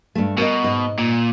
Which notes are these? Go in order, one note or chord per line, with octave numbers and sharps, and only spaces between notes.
G2 A3
B2 A#4 C#5 D#5
G#2 D#5
A#2